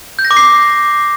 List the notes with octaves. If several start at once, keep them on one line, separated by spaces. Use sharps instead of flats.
G6
A#6
D6
C7